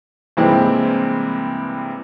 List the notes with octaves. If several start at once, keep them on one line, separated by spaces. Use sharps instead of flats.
G2 C3 E3 G#3 A#3 C4